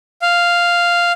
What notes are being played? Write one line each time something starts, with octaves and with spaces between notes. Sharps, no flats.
F5